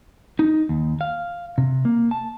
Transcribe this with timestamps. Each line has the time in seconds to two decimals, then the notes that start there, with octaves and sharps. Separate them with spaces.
0.39 D#4
0.69 D#2
1.01 F5
1.58 C3
1.85 A#3
2.11 A5